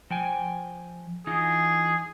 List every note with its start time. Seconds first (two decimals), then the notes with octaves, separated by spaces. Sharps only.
0.10 F3 G5 G#5
1.27 E3 D#4 F4 G#4